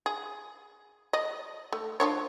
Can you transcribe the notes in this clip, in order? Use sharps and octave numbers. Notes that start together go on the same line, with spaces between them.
G#4
D5 D#5
A3
F3 D4 C#5